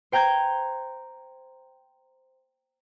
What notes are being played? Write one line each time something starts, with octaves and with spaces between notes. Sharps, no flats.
C5 G5 A#5 G6 G#6